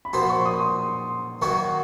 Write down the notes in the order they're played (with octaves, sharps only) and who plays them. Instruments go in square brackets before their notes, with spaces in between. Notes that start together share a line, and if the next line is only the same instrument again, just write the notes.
[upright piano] B5
[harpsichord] A#2 F3 A#3 D#4 F#4 [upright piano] C6
[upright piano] C#6
D#6
C6
[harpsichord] D#3 F#3 A#3 D#4 F#4 [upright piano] C#6